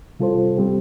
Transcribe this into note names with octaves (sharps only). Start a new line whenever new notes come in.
C3 G3 F4 A4 C5
G3 C4 G4